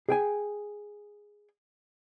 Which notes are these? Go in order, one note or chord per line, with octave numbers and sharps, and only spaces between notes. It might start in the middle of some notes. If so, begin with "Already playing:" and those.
G#4 G5 G#5